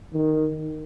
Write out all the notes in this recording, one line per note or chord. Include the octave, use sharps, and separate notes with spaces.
D#3